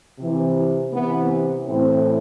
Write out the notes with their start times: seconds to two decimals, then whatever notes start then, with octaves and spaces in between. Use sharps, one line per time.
0.19 C3 E3
0.93 C3 E3 B3
1.67 A2 E3 C4